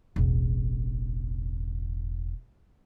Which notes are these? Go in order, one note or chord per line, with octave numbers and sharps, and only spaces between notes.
E1 A1